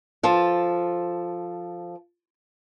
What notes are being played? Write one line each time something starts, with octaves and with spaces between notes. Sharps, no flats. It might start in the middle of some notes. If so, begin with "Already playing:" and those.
F3 A4